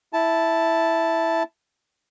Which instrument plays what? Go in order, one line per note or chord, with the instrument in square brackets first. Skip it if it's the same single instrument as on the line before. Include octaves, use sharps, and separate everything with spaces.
[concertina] E4 A5